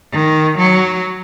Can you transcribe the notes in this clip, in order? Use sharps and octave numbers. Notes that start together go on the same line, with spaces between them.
D#3
F#3